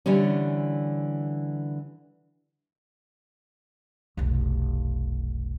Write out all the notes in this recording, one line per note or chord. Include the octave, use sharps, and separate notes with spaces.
D3 E3 G3 C#4
F1 B1